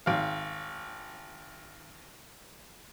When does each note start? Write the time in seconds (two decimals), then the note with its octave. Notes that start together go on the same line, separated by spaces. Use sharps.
0.06 G#1 F5